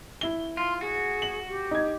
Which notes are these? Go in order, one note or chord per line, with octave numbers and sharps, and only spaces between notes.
E4 G7
F4 C6
F#4 G#4
F#7
G4
D#4 G#6